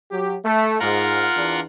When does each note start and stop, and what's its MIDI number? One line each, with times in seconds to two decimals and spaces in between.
0.10 0.37 54
0.10 0.37 67
0.43 0.77 57
0.80 1.25 44
0.80 1.60 65
0.80 1.60 70
0.80 1.60 78
1.35 1.63 40
1.35 1.63 62